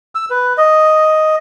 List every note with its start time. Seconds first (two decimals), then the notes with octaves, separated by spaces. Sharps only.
0.15 E6
0.30 B4
0.58 D#5